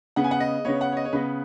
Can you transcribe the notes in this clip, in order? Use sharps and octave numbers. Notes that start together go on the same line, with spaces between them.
C#3 B3 F#5
G#5
F#5
D#5
C#3 B3 C#5
F#5
C#5
D#5
C#5
C#3 B3 B4